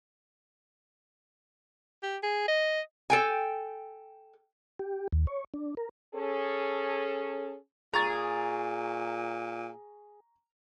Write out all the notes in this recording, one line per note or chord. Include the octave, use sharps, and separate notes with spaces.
G4
G#4
D#5
A4 G5 G#5
G4
D#2
C#5
D4
A#4
C#4 G#4 A4
A#2 G#4 A#5 C#6 A6